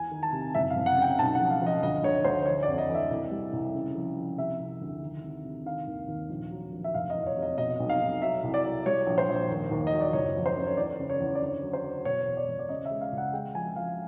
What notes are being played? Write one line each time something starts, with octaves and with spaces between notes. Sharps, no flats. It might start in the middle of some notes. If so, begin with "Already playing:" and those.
Already playing: E2 G#5
D#3
A5
C3
F#1 E5
F5
F#1
F#5
C#3 G5
B1 A5
F#5
F3
F5
F3 D#5
D2 D#5
D2 C#5
D2 C5
E3 C#5
D5
F2
D#5
E3
E5
C2
G3
C2
C#3
F3
F3
C3 E5
C3
D2
D#3
C3
C3
D#3 F5
D#2
D#2
A#1
F#3
A#1
E5
F1 F5
D#5
E2
C#5
C3
D#5
B2 D#5
B1
F5
B1
F#3 E5
C2
D5
F#3
G3 C#5
A#1
C5
A#1
D#2
D#2
D#5
F#3
D5
F#1 C#5
F3
C5
F#2
C#5
E2 D5
C#3
C#5
E2
D5
D3 C#5
F#3
C5
F#3
B2 C#5
E2
D5
E1
D5
C#3 D#5
E5
G#3
F5
C#2
F#5
G#3 G5
F3 G#5
F3 F5